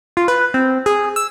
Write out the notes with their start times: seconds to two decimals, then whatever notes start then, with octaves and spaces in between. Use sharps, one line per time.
0.17 F4
0.28 B4
0.54 C4
0.86 G#4
1.16 E6